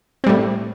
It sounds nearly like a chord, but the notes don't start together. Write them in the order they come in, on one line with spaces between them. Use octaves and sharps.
C4 G3 A2